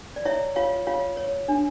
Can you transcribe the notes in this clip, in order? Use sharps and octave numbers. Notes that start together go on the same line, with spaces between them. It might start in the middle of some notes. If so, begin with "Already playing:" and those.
D5
E4 C#5 E5
F4 C#5 F5
F4 C#5 F5
C#5
D4